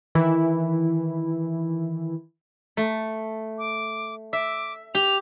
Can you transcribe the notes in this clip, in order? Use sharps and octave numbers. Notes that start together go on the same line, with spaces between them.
D#3 E3 E4
A3
D6
E5 D6
G4 F7